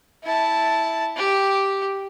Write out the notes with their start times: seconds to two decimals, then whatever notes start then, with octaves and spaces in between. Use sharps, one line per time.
0.24 E4 A5
1.17 G4